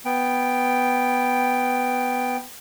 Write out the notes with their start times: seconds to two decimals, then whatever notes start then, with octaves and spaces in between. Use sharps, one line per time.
0.05 B3 G5